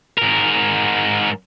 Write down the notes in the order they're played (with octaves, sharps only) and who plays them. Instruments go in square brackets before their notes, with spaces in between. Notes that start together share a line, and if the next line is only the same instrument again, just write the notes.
[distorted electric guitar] G#2 A#4